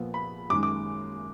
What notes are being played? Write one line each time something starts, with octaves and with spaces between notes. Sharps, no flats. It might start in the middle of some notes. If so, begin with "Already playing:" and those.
Already playing: A#1 A#2 F3 B3
B5
F#2 D#3 G#3 D6
D6